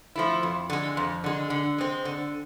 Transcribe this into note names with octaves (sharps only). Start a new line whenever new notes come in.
F3 A3 E4
F2
D3 G#3
F2
D3 G#3
D3
G#3 C4
D3